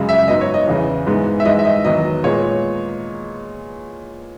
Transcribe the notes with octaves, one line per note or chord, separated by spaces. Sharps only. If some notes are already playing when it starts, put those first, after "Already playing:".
Already playing: F#2 C#3 G#3
E5
G#2 F#3 B3 D#5
C#5
D#5
E2 C#3 E3
G#2 E3 G#3 B3
E5
G#2 E3 G#3 D#5
E5
D#5
E2 D#3 F#3 B3 D#5
A#2 G#3 B3 C#5